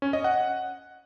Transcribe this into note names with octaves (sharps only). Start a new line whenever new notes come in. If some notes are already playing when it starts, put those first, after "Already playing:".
C#4
D#5
F#5